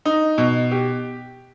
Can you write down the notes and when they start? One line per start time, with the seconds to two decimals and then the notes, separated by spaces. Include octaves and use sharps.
0.05 D#4
0.38 B2
0.71 G4